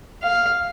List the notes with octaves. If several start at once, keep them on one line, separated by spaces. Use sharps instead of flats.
F5